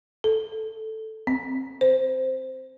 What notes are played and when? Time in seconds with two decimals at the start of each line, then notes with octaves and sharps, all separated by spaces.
0.24 A4
1.27 C4
1.81 C5